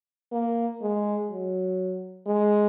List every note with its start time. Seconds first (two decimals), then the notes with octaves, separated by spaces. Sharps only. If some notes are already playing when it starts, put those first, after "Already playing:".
0.32 A#3
0.81 G#3
1.30 F#3
2.27 G#3